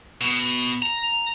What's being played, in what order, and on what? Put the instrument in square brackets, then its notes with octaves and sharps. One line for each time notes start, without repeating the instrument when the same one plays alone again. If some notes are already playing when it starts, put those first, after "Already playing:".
[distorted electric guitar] B2
A#5